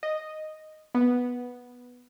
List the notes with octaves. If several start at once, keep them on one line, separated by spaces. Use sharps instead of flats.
D#5
B3